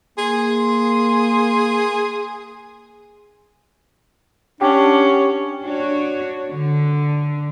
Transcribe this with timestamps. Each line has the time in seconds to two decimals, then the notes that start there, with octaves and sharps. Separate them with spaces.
0.18 A#3 G#4 C6
4.61 C#4 D4 G4 F#5 G5
5.64 D4 F#4 C#5
6.51 D3